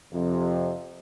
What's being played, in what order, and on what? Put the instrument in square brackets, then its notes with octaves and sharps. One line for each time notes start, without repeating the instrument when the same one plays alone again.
[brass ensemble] F2 C3